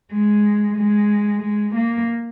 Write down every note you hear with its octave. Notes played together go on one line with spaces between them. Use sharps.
G#3
G#3
G#3
A#3